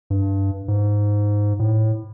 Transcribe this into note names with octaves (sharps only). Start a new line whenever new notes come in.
G2
G#2
A2